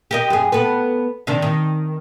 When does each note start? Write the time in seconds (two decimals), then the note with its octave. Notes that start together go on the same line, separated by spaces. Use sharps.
0.11 G4 A#4 D#5
0.30 F#2 G#4
0.52 B3 A4 B4
1.27 C3 D#3 D4
1.42 D#3